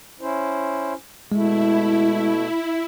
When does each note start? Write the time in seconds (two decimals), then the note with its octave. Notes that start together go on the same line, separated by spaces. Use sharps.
0.21 C#4 E4 C5
1.32 B2 G#3 A3 E4